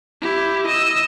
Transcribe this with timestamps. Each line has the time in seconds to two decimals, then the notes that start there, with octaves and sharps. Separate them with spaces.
0.21 E4 G4
0.66 D#5 E6